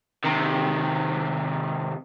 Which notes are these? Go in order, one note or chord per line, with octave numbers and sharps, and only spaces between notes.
C3 D#3